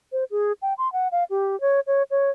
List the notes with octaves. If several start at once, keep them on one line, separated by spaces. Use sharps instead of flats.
C5
G#4
G5
C6
F#5
F5
G4
C#5
C#5
C#5